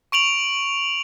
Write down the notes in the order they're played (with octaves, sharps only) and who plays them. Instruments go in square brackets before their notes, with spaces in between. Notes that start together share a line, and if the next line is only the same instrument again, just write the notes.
[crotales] C#6 D7 F7 F#7